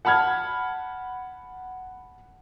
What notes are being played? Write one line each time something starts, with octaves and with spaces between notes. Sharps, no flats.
F#5 A5 B5 F6 G#6